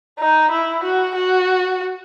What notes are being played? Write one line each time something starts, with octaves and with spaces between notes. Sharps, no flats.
D#4
E4
F#4
F#4